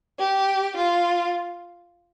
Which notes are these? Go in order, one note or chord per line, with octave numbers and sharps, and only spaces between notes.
G4
F4